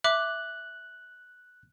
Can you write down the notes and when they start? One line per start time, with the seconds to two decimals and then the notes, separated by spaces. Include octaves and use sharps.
0.04 E5 D6 F#6